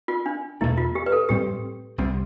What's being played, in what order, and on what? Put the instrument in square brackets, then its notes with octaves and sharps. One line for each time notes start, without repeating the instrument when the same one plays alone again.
[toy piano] F4
D4
[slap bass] E2 B2 A3 D4 [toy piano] E4
[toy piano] F4
G4
B4
A4
[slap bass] A2 G3 C4 [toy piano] G4
[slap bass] C2 C3 G3 C4